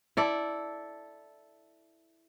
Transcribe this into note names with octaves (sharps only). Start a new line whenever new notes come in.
E4 A4 D5